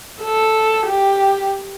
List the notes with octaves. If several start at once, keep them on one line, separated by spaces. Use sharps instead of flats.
A4
G4